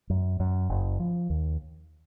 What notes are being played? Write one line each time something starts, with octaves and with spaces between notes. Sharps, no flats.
F#2
F#2
F#1
F3
D#2